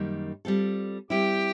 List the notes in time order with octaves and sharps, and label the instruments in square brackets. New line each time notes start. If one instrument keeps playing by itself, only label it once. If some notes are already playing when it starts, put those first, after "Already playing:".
Already playing: [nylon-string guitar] F#2 D#3 G3 A#3
G3 C4 F4 A4
[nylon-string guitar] G3 C4 E4 [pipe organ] G4 G5